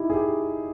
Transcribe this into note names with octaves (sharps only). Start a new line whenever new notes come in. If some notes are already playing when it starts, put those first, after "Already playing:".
Already playing: D#4 E4 G4
G#4
G4